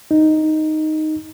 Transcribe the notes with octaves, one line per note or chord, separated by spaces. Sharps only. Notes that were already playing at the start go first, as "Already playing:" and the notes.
D#4